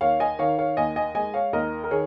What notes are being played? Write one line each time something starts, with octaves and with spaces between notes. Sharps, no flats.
D#2 C#5 F5
D#5 G#5
D#3 C#5 F5
C#5 F5
D#2 D#5 G#5
D#5 G#5
G#3 D#5 G#5
C#5 F5
D#2 A#4 D#5
A#4
D#3 G#4 C#5